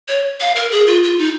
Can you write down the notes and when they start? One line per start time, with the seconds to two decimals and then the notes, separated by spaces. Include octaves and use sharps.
0.08 C#5
0.40 F5
0.56 A#4
0.72 G#4
0.87 F4
1.03 F4
1.18 D#4